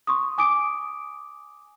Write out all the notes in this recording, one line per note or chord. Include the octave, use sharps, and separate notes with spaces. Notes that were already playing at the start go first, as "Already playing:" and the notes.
C6 C#6 D#6
G#5 D6 D#6 D7